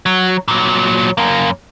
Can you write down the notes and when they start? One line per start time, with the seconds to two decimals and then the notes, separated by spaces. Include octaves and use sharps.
0.06 F#3
0.48 A#2 F#3
1.18 F#2 A#3